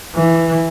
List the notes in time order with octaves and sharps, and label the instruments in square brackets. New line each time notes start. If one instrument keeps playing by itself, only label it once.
[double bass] E3